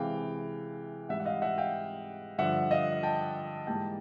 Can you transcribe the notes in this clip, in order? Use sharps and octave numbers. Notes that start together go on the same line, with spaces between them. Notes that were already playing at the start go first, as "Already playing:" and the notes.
Already playing: C3 E3 G#3 F5 G5
G#2 E3 G3 E5 F#5
F#5
D#5 F5
E5 F#5
F5 G5
G2 D3 F3 E5 F#5
D#5 F5
G5 A5
G#2 E3 G3 A#3 G5 A5